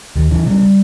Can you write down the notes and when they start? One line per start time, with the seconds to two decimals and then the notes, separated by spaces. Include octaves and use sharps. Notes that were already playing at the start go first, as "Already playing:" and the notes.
0.16 D#2 D#3
0.31 C#3 E3
0.46 C#3 G3